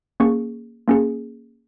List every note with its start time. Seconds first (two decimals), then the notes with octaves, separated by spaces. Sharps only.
0.20 A#3 C#4 G#4 C#6
0.88 A#3 C#4 G#4